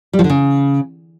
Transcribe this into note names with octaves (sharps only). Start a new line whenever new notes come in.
G3
F3
D3
C#3